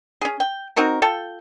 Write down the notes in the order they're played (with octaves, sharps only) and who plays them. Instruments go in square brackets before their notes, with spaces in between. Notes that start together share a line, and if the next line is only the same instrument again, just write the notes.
[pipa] C#4 G#4
G5
C4 D#4 F#4 A#4
F4 A4 G5